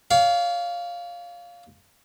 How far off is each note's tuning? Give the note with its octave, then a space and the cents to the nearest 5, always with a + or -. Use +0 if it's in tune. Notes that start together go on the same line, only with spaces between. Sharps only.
C#5 +45 F5 +0